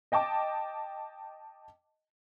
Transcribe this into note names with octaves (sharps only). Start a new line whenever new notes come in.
D#5 G5 A5 D6